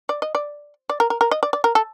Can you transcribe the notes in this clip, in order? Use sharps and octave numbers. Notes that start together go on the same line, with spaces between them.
D5
D#5
D5
D5
A#4
A#4
A#4
D#5
D5
D5
A#4
A4